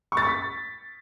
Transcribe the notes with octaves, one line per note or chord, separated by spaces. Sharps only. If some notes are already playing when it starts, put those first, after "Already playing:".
C#6
A6
C#6
B6